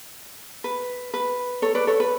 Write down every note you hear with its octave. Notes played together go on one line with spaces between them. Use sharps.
B4
B4
A4 C#5
B4 D5
A4 C#5
B4